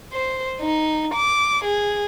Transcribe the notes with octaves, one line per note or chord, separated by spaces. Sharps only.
C5
D#4
D6
G#4